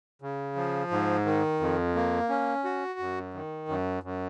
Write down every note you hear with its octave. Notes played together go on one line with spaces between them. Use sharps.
C#3
F3
G#2
D#3
F2
A#3
C#4
F#4
F#2
D#3
F#2
F#2